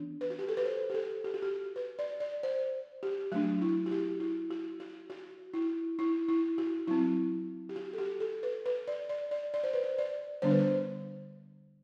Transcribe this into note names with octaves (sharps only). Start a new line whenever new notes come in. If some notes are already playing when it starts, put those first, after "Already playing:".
Already playing: E3 B3 D4
B4
F#4
G4
A4
B4
C5
G4
A4
G4
F#4
G4
B4
D5
D5
C5
G4
F#3 A3 D4 F#4
E4
F#4
G4
E4
F#4
F#4
F#4
E4
E4
E4
F#4
F#3 C4 E4
G4
F#4
A4
G4
A4
B4
B4
D5
D5
D5
D5
C5
B4
C5
D5
D3 G3 B3 D4 C5
B4
C5